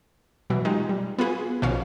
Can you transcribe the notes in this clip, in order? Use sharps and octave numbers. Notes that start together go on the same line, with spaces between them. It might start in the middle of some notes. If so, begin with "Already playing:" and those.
B2 E3 F#3
G#3 D#4 F4 G4
G3
B3 F4 F#4 G#4 B4
A#1 B2 D#3 C#4 C#5 F5